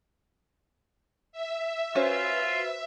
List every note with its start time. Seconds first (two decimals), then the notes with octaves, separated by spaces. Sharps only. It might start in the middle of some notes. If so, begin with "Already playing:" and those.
1.32 E5
1.95 C#4 F4 F#4 B4 C5